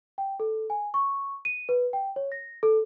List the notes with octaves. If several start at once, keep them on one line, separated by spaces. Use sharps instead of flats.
G5
A4
G#5
C#6
D#7
B4
G5
C#5
A#6
A4